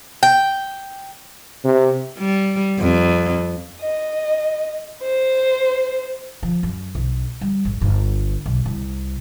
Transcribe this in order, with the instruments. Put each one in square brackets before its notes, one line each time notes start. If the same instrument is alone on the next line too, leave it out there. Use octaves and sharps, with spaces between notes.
[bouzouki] G5
[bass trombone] C3
[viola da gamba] G3
F2
[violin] D#5
C5
[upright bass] F3
F#2
B1
G3
G#1
G1
B1
C2